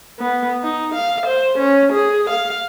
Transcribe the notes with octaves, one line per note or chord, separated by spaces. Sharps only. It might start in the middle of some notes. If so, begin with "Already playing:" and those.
B3
D#4
F5
C5
C#4
G#4
F5